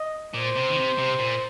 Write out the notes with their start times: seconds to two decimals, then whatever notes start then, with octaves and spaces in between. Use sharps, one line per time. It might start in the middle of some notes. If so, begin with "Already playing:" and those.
Already playing: D#5
0.34 A#2 C5
0.56 C3
0.69 D#3
0.76 C3
0.98 C3
1.19 A#2